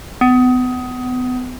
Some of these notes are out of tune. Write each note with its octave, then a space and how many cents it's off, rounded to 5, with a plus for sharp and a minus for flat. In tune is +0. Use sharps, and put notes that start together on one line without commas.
B3 +30